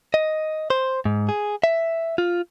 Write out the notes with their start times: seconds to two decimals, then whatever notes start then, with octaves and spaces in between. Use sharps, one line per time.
0.14 D#5
0.70 C5
1.05 G#2
1.29 G#4
1.64 E5
2.18 F4